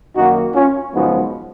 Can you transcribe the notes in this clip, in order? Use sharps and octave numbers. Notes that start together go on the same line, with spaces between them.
F#2 D#3 A#3 D#4 F#4
C#4 F4
F#2 C#3 F3 G#3 B3 D#4 F#4